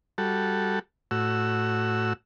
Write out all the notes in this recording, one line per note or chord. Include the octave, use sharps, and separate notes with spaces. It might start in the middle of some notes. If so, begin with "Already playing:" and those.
G3 F#4 A4
A2 F#4 E6